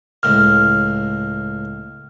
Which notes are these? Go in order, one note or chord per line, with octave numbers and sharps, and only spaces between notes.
C#2 A2 F6